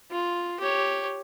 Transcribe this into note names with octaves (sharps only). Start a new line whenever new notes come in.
F4
G4 C#5